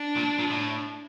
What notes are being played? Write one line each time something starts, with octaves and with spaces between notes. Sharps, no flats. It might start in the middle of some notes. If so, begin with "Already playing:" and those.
Already playing: D4
A#2
A#2
A2